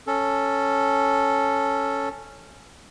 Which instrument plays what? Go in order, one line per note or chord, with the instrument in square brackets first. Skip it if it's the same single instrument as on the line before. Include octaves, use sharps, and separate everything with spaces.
[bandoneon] C#4 A4